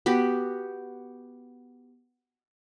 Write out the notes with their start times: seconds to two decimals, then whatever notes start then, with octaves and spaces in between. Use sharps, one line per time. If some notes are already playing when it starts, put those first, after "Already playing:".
0.06 B3 F#4 G4